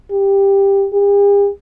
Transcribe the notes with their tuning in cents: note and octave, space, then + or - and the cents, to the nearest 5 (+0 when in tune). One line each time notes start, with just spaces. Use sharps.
G4 +10
G4 +45